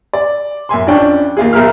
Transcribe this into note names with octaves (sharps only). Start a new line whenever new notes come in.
D5
F#2 E5 G#5 C6
F2 C#4 D4 G5
D#2 F4 G#4
B1 G#4 A#4 E5 F6